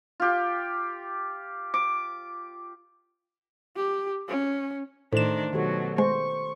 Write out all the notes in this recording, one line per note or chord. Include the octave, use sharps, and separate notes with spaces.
F4 G4
D6
G4
C#4
A2 D#3 A3 D4 C5 E7
B2 D#3 F#3 G4 A4
G#3 C5 C#6